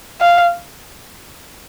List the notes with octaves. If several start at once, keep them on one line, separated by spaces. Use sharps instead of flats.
F5